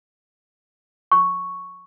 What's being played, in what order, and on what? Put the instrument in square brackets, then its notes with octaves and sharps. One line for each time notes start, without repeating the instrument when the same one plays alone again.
[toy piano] C#6